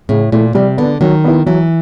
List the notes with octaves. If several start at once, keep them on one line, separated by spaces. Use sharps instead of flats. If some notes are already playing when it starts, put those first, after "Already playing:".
A2 C#3
A#2 E3 A3
C3 G3
D3 B3 D4
D#3 F#3
B3 E4
E3 F#3